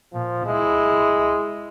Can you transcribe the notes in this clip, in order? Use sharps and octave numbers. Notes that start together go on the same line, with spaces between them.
A#2 F3
G#3 E4